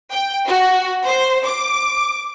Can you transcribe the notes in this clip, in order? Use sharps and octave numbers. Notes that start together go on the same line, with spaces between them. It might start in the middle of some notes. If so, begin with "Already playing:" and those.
G5
F#4
C5
D6